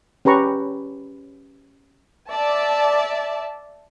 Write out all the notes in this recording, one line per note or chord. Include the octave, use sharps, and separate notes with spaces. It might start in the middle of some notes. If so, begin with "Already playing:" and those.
C#4 G4 B4 A#5 C#6
D5 E5 A5